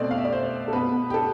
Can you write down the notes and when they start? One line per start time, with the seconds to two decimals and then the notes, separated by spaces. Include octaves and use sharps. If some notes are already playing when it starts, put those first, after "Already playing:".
Already playing: B2 A3 C4 D5
0.11 F5
0.18 E5
0.25 D5
0.33 C5
0.68 A4
0.73 B2 B3 B4
1.10 G4
1.14 A4